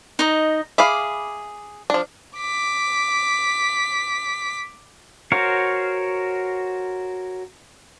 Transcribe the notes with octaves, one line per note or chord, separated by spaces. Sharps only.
D#4 D#5
G#4 E5 F5 B5 D6
F3 D4
D6 B6
F#4 A#4 C5 C#5 F5